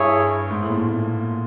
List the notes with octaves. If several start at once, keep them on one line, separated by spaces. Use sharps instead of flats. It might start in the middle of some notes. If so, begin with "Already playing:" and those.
Already playing: G2 E4 G#4 C#5
G#2
A2
A#2
A2
A#2